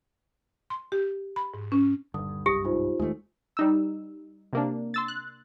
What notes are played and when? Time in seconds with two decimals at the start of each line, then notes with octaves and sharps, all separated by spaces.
0.70 C6
0.92 G4
1.36 B5
1.54 G#2
1.72 C#4
2.14 D#1 G2 D3 D#6
2.46 F#1 C2 F#2 G4 D#6 A#6
2.64 C2 G#2 D#4 F4 C5
3.00 D1 D#2 G#3 A3
3.57 G3 D#4 E6
4.53 C3 A#3 D4
4.94 C6 E6 A6
5.08 F#6